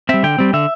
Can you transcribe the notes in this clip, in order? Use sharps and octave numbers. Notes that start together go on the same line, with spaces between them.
G3 C4 E5
D3 G5
G3 C4
D3 E5